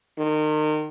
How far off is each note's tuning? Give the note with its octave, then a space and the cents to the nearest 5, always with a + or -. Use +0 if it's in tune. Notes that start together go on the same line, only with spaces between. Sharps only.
D#3 -30